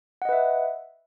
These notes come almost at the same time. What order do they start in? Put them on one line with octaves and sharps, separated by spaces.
F#5 D#5 B4 E5